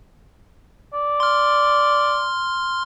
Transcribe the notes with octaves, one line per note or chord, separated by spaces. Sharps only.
D5
C6 F6